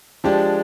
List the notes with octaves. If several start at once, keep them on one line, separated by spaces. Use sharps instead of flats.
F3 G#3 D4 G4